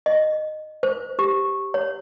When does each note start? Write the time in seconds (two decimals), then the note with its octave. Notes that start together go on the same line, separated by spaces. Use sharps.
0.06 D#5
0.83 C5
1.19 G4
1.74 C#5